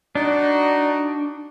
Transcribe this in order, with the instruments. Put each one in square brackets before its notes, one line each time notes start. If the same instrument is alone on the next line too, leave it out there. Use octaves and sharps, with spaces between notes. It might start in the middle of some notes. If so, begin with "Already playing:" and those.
[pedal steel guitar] D4 [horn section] D#4 F#4